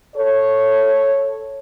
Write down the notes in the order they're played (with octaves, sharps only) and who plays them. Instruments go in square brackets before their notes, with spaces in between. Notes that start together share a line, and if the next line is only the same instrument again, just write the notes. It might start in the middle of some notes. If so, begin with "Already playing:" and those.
[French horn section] A4 C#5